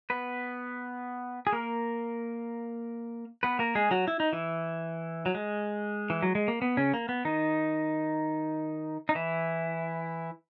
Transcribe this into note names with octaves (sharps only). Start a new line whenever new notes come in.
B3 B4
G#4
A#3 A#4
B3 B4
A#3 A#4
G#3 G#4
F#3 F#4
E4
D#4
E3 E4
F#3
G#3
E3
F#3
G#3
A#3
B3
C#3 C#4
A#3
B3
D#3 D#4
D#4
E3 E4